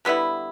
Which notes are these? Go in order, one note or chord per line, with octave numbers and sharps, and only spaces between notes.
D3 G3 B3 E4